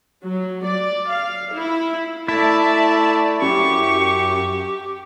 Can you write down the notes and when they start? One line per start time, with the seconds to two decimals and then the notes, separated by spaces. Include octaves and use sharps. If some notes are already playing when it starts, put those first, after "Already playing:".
0.24 F#3
0.66 D5
1.10 F5
1.54 E4
2.28 A3 E4 D5 E5 A5
3.42 F#2 G4 C#6